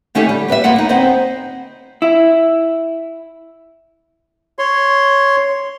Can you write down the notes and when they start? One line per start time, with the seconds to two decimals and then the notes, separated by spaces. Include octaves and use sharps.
0.15 D3 A3 C#4 D#4 G4 A4
0.29 G3
0.48 G4 B4 D#5 E5
0.64 G3 A#3 B3 F4 F#5
0.76 D2 D#4
0.89 B3 C4 C5 D#5
2.02 E4
4.59 C#5 C6